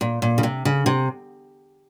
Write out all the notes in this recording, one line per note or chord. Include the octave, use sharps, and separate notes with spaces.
A#2
A#2
C#3
C3
C#3
C3